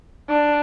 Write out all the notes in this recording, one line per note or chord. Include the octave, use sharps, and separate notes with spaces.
D4